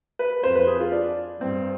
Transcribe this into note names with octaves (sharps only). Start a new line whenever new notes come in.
B4
F2 C5
B4
G#4
F4
D4
G2 C4